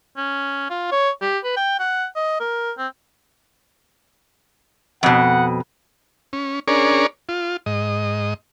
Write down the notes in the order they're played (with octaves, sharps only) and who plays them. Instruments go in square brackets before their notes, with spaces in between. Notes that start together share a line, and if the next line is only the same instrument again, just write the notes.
[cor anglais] C#4
F4
C#5
G4
B4
G5
F#5
D#5
A#4
C4
[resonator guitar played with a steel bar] F2 B2 [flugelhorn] F#5
[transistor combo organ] C#4
C#4 D4 G#4 A#4 C#5 D5
F4
G#2 D#5